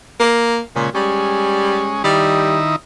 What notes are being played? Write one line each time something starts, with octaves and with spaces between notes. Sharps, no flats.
A#3
A#2 C#3 G#3
G3 G#3 C#4
D#3 G3 D#4 E4